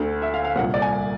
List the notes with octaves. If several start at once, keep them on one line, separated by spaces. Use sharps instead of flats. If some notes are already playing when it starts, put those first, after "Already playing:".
Already playing: D2 D3
E5
F5
F5
C2 A#2 F#5
D5
G#5